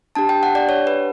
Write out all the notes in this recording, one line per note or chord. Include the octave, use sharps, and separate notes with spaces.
D4 G4 A5
G5
F#5
D5
C#5
B4